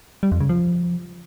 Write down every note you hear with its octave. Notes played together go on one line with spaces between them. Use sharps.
G3
F2
C#3
F3